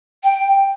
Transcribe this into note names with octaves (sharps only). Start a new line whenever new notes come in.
G5